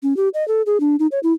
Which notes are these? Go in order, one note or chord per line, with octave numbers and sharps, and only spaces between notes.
C#4
G4
D#5
A4
G#4
D4
D#4
C#5
E4